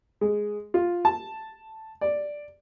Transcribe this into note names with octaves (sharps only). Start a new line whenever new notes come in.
G#3
F4
A5
D5